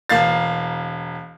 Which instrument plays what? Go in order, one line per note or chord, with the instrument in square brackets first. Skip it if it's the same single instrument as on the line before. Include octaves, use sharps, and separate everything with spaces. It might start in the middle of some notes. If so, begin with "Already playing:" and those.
[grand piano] E1 A#3 F5 A6